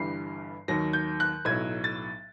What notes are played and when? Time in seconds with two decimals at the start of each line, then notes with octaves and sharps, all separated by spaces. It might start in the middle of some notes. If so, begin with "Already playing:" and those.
Already playing: G1 G2 E3 G3 C7
0.68 D#2 D#3 F#3 A#6
0.93 G6
1.20 F#6
1.45 B1 A2 F#3 G#6
1.84 A6